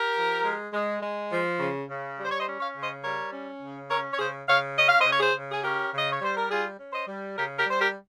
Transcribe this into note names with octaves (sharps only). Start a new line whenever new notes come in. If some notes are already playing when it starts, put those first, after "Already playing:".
Already playing: G4 A#4
F3
G#3
G#3
G#3
F3
C#3
C#3
G3
C5
C#5
C5 D#5
C#4
C#5 F5
C#3
C5 D#5
G3 A#4 C#5
C#4
C#3
C#4 A#4 C#5
C#5
C#3 G#4 C5
C#3 C#5 F5
C#4 D#5
F5
C5 D#5
C#3
C#5
G#4 C5
C#3
G#4
C#4 G4 A#4
C#3
D#5
C#5
G3 C5
A#4
G3 F4 G#4
C#4
C5 D#5
G3
C#3 G4 A#4
G4 A#4
G3
C5
G4 A#4